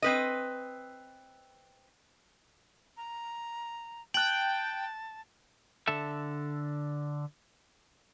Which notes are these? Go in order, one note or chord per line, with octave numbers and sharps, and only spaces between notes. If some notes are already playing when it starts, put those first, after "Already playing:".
C4 B4 D#5
A#5
G5 A5 F#6 F#7
D3 A4 E5